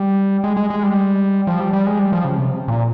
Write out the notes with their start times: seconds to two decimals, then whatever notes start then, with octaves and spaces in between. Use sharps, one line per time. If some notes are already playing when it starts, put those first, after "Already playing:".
Already playing: G3
0.44 G#3
0.57 G#3
0.70 G#3
0.83 G3
1.47 F3
1.60 G3
1.73 G3
1.86 G#3
1.99 G3
2.12 F3
2.25 C#3
2.38 C3
2.68 A#2